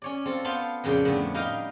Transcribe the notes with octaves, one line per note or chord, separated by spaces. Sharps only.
C#4 C#5 D5
C4 F4 A4
B3 F5 G5 A5 C6
F2 A#2 C#3 G5
A2 D3 B3
G3 D#4 A#4 D#5 F5 G5